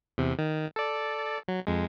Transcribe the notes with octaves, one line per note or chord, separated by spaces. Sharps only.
E2 C3
D#3
A4 D5
F#3
F2 G#3